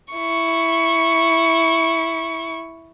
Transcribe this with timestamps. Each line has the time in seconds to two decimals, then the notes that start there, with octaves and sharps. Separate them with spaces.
0.14 E4 C#6